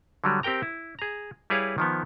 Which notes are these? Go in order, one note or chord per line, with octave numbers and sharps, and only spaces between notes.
D3 F#3 G3
C4 G4 A#4 G5 A#5
E4
G#4 A#5
G3 E4 G#4 B4 C#5 F5
D#3 F3 B3